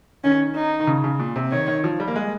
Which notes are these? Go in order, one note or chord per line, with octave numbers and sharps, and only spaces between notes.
D#3 C#4
D#4
D#3
C#3
C#3
A#2
C3
D#3 C#5
D#3
F3
G3
A#3
G#3